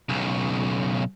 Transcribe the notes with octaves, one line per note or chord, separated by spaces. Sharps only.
B1 C#3